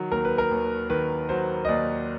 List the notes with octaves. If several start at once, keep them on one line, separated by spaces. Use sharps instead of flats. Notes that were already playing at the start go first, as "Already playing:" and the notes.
Already playing: D#3 F#3
D#2 A#4
B4
A#4
D#2
D#3 B4
F#3 C5
D#5
D#2 D5